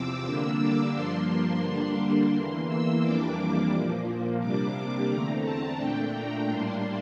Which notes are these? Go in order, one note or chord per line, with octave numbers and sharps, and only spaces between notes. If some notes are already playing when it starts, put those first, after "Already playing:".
Already playing: E2 C3 F3 C4 D6 E6
D3 G3 A#3 D4
D6
G2 F3 A#3 D4 C6
D3 G3 A#3 D4
E2 E3 A#3 C6
E6
F2 E3 G3 A#3 D4 D6
A#2 F3 A#3
C3 G3 A#3 D4 D6
E2 D3 A3 C4 A#5
A5
A#2 A3 D4 G5
A#5
A2 G3 A#3 D4 C6